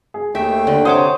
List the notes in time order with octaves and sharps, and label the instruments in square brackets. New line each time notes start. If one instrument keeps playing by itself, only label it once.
[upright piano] G#4
[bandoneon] D#2 A3 G5 [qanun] E5
[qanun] D3
[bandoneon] C3 [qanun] C5 C#5 D6 [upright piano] F#5 D#6